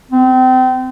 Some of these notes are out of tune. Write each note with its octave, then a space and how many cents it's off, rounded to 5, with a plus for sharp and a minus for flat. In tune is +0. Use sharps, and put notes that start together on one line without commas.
C4 -30